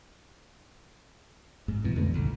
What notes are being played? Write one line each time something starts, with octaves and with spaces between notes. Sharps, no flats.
G#2
C2 B2 E3
F2 D3 A3
C2 A#2